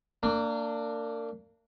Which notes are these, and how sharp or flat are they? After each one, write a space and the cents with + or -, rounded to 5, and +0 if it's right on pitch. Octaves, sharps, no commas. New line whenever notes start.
A#3 -30 D4 +0